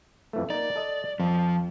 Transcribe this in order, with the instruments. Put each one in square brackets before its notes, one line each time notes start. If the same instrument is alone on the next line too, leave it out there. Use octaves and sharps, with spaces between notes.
[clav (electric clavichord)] F2 E3 A3
[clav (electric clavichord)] A#3 D#4 [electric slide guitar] D5
[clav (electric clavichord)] A4 D#5
[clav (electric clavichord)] F2 [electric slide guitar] F3